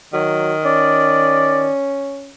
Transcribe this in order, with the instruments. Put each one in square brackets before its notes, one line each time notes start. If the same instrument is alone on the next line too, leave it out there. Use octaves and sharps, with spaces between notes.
[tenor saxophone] D#3 [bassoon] F#3
[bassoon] C#4 [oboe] D5